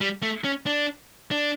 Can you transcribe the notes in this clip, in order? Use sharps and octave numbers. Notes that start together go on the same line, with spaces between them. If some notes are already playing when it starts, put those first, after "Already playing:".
G3
A3
C#4
D4
D4